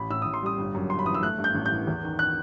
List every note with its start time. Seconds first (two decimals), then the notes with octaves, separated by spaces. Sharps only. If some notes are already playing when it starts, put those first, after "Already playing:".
Already playing: A1 B5
0.10 A2 E6
0.22 A1 D#6
0.34 C6
0.43 G3 D#6
0.58 G1
0.75 F#2
0.90 G1 C6
0.99 B5
1.06 E3 D#6
1.14 E6
1.23 A3 F#6
1.38 G2
1.44 G6
1.55 A1
1.66 G6
1.71 E3
1.87 E2
2.03 D#3
2.19 F#6